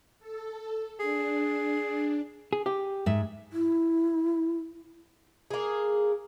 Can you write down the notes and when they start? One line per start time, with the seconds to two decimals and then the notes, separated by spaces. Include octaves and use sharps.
0.19 A4
1.00 D4 G#4
2.53 G#4
2.66 G4
3.06 G#2 E5
3.53 E4
5.50 A#3 G#4